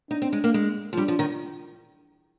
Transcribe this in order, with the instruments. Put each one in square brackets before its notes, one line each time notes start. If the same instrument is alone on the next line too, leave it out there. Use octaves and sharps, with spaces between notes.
[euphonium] D4 [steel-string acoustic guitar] D#4
[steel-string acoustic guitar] C4
G#3
A#3
G#3
F3
[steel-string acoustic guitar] G3 [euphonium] D4
[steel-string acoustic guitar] F3
D#3